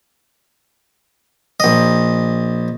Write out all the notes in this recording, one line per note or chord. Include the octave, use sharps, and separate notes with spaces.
A#1 D#5